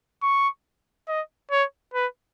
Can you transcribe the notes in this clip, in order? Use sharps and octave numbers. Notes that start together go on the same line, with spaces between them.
C#6
D#5
C#5
B4